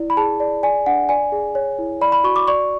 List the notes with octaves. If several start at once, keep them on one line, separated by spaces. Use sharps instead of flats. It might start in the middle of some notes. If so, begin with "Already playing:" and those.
Already playing: E4 D5
B5
G#4 A5
D5
D5 G#5
D4 F#5
D5 G#5
G#4
C#5
E4
D5 B5
B5
F#4 C#6
D6
D5 C#6